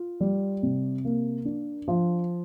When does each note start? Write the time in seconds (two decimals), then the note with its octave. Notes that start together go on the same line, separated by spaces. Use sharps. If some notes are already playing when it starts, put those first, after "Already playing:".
Already playing: F4
0.21 G3
0.63 C3
1.05 A#3
1.45 D4
1.88 F3